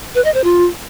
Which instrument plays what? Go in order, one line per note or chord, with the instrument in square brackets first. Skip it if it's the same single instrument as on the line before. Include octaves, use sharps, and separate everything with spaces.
[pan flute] B4
D#5
C5
F4